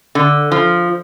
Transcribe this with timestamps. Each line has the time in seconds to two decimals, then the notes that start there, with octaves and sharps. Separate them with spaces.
0.15 D3
0.52 F3